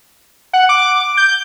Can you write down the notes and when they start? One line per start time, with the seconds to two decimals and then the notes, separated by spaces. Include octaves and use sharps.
0.53 F#5
0.69 D6
1.17 G6